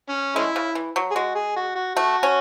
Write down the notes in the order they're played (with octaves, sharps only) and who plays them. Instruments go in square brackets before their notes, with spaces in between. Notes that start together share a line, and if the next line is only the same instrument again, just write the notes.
[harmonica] C#4
[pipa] G#3 [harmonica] A3 C#4 E4
[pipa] C#3
E3
F#3
[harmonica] G#4
[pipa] G#3 [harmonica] F#4
[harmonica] G#4
F#4
F#4
[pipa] A3 [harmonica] F#4
[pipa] C#4